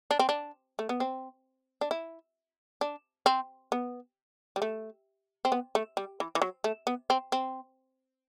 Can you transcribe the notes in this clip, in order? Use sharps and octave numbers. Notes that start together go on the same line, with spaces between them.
D4
C4
D4
A3
B3
C4
D4
E4
D4
C4
B3
G3
A3
C4
B3
A3
G3
E3
E3
F#3
A3
B3
C4
C4